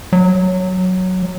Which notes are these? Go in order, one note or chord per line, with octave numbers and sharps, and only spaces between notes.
F#3